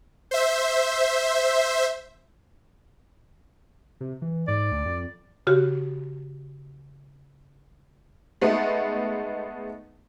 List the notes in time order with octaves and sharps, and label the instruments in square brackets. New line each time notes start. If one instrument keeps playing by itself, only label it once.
[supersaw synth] C5 E5
[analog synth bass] C3
E3
[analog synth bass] G#2 [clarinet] D5
[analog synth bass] D2
F2
[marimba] C#3 F#4 G4
[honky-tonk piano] G#3 A3 B3 D#4